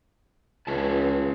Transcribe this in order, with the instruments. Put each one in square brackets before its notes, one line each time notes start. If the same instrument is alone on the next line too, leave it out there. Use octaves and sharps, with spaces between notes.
[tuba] C#2 [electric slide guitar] C#4 B4 A5